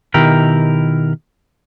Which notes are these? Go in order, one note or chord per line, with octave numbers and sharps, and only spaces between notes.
B2 D#3 E4 G4 A#4